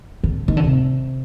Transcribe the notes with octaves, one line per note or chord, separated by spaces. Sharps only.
D3
D#3
D3
C3